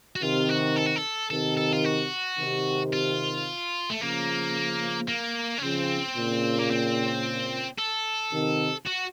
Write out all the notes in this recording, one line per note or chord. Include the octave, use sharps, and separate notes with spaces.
F#4
C3 D#3 F4
F#4
A4
F#4
A4
C3 D#3 A4
A4
F4
F#4
C3 D#3
F4
A3
C#3 F3 A#3
A#3
C#4
C#3 F3 C4
A#2 C#3
A#3
C4
A4
C3 D#3
F#4